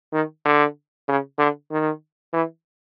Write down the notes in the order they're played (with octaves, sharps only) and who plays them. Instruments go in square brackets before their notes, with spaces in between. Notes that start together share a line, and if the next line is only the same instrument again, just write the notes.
[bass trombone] D#3
D3
C#3
D3
D#3
E3